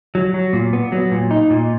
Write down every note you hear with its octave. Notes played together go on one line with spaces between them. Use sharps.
F#3
F#3
A#2
B3
F#3
A#2
D#4
A#2